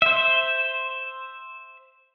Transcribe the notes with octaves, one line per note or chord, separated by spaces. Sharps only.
C5 E5